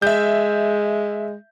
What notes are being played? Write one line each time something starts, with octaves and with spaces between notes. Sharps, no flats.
G#3 E5 G6